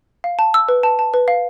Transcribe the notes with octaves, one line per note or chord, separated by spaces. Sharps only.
F5
A5
E6
B4
A5
A5
B4
F5